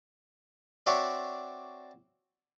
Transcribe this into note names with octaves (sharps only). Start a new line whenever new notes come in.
C4 D4 F#4 C#5 D5 E5